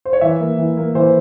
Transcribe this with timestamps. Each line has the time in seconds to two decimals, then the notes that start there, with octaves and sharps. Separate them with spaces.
0.05 C5
0.13 C#5
0.21 E3 E5
0.40 A#3
0.58 E3
0.77 A#3
0.95 E3 C5